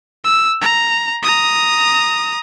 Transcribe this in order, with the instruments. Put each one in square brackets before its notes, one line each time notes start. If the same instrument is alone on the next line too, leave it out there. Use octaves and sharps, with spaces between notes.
[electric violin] E6
A#5
A#5 D#6